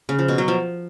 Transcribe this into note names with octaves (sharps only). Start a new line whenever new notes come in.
C#3
F3
B2
F#3
F3